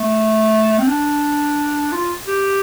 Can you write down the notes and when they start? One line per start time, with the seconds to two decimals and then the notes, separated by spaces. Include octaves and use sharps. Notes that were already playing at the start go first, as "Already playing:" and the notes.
Already playing: A3
0.79 C4
0.88 D4
1.92 F4
2.28 G4